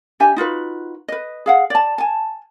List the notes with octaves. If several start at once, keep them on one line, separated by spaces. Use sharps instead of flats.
D4 G4 E5 G#5
D#4 F4 F#4 B4
B4 D#5
G#4 F5 F#5
D5 A5
G#5 A5